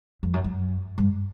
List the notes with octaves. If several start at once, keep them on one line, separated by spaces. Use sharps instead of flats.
F2
F#2
F#2
G2